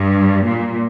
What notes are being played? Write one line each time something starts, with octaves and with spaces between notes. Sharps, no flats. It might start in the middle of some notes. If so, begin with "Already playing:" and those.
Already playing: G2
A#2